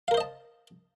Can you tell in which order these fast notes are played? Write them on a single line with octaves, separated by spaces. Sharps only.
F5 A#4 C5 D#5 A5